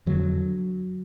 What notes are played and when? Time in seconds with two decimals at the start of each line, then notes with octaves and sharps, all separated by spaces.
0.06 F2 D3 F#3